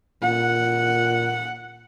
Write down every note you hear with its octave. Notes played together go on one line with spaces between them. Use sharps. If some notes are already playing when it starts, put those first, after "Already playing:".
A#2 F#5